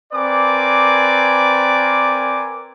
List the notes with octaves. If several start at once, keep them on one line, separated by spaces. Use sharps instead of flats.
C4 A#4 B4 D5 G#5 D6